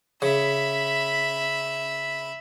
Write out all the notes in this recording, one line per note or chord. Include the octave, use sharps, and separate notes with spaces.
C#3 E5 B5